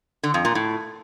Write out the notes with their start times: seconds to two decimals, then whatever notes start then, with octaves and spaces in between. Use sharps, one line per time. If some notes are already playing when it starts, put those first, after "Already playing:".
0.23 D3
0.34 F2
0.45 A#2
0.55 A2